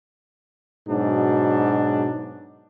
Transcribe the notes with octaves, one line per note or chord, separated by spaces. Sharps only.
G#2 B2 F#3 D4